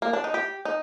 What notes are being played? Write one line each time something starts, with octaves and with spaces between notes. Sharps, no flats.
A#3
D4
D#4
G4
D#4